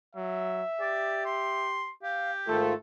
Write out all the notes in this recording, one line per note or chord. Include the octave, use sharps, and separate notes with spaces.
F#3 E5
G4 D5
C6
G4 F5
G#2 D#3 A3 F4 A4